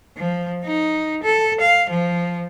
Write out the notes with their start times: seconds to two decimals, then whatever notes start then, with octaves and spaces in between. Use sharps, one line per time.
0.17 F3
0.64 D#4
1.23 A4
1.61 F5
1.90 F3